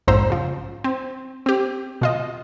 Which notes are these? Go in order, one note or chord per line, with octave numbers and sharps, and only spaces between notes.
A#1 F2 G#2 C5 A#5 E6
C#3 F3
C4
C4 G4
B2 F4 D#5